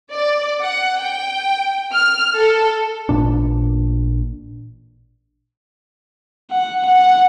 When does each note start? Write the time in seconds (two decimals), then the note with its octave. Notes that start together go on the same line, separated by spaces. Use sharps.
0.14 D5
0.62 F#5
1.00 G5
1.94 F6
2.36 A4
3.09 A1 A#2 D4
6.51 F#5
6.86 F#5